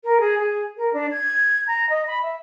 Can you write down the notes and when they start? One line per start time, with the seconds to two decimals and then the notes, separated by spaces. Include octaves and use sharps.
0.04 A#4
0.20 G#4
0.38 G#4
0.77 A#4
0.93 D4
1.11 G#6
1.67 A#5
1.89 D#5
2.07 B5
2.22 E5